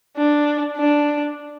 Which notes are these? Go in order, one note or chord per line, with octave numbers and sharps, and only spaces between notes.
D4
D4